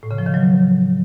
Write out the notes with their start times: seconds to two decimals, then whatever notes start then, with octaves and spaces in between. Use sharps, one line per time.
0.03 A2
0.11 C#3
0.18 F3
0.26 D#3
0.34 F#3